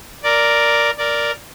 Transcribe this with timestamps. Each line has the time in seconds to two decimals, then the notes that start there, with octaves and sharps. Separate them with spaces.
0.23 A#4 D5
0.98 A#4 D5